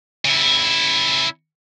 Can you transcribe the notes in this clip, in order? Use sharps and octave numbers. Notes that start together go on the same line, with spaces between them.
C#3 E4